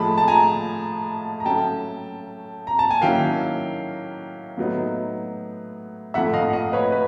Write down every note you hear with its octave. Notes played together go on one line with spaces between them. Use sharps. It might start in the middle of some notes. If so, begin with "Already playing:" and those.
Already playing: A2 F3 G#3 A5 B5
A5
G#5 A#5
A#5
F#3 A3 C#4 G5 A5
A#5
A5
G#5
D#3 F#3 A#3 C#4 E4 F5 G5
A2 F#3 B3 D#4
A2 F3 A3 E5 F#5
D#5 F5
F#5
D#5 F5
B4 C#5
B4